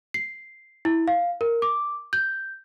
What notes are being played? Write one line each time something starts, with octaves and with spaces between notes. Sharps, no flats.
C7
E4
F5
A#4
D6
G6